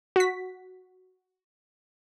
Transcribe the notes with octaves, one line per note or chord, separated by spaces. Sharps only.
F#4 B6